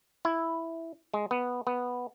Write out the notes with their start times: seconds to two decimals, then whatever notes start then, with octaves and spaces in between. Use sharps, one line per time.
0.25 E4
1.14 G#3
1.31 B3
1.67 B3